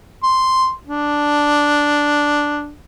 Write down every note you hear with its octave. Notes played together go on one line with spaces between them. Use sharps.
C6
D4